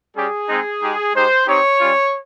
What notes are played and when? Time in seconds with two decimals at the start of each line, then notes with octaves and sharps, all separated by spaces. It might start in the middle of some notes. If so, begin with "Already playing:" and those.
0.16 G3 C#4 G4 G#4
0.48 G#3 C4 D#4
0.82 G#3 D#4 G4
1.14 G#3 D#4 G4 C5
1.47 C4 D#4 G4 C#5
1.79 G3 C#4 F4